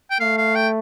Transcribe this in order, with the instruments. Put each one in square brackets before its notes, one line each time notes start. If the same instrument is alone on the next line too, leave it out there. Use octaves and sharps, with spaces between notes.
[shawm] G5
[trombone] A3 [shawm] F5
[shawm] F5
G5